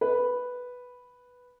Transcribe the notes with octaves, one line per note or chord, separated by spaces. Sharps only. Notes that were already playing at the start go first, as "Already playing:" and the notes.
B4